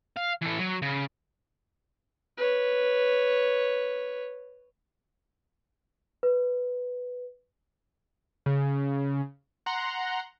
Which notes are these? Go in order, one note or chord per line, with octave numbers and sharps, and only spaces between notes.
F5
E3 A4
F#3
C#3
B4 C#5
B4
C#3
F#5 A#5 C6